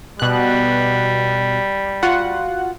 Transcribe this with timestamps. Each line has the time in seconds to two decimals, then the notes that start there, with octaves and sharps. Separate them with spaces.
0.20 B2 G3 F#6
2.03 F4 F#4 F#5